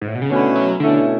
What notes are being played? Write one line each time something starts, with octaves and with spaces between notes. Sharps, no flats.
G#2
A2
B2
C#3
B2 D3 A3 C#4 E4
F#3
B2 D3 A3 C#4 E4